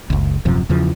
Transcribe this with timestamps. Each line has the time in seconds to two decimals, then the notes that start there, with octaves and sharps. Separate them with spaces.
0.10 F#1 C#2
0.45 D#1 F#2 C3 F3
0.69 E2 C#3 E3 F3